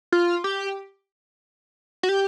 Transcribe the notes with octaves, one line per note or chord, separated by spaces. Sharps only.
F4
G4
F#4
G4